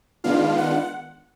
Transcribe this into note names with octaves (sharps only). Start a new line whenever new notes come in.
D#3 G#3 B3 D4 F4 F5
F#5